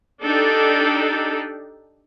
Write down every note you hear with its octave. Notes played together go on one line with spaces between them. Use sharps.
D4 D#4 G4 A4